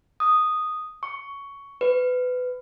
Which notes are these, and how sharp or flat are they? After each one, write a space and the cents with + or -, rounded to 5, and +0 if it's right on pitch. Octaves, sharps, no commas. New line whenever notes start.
D#6 -5
C#6 +10
B4 +25